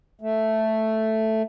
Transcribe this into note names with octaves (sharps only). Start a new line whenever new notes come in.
A3